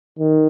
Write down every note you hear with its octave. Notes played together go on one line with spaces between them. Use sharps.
D#3